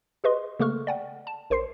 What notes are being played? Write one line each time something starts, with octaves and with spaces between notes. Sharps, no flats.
G4 G#4 B4 D#5 C6
C#3 A3 A#3 A4 C#6 F6
D5 F#5 G5
A5
A#1 A#4 C5 C6 C7